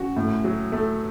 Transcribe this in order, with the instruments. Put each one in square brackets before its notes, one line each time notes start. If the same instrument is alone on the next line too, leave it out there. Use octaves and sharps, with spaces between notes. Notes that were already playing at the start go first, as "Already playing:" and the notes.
Already playing: [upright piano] C#4 F#4
A2
F#3
A3